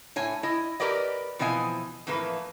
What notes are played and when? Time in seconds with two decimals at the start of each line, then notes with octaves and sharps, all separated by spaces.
0.16 A2 C#5 G#5
0.43 E4 D#5
0.80 G4 A#4 B4 D5 D#5
1.39 B2 E3 F3 C4 D#5 G#5
2.07 F2 A2 E3 A#3 B4